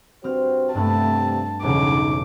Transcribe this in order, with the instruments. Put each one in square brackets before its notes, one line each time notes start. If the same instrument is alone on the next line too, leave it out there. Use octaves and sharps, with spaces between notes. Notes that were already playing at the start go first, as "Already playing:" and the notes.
[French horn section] G2 F#4 C5 [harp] C4 F6
[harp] G2 B3 [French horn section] C3 [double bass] A3 [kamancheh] A5
[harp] B1 E2 [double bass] C#3 [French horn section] D#4 [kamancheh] D6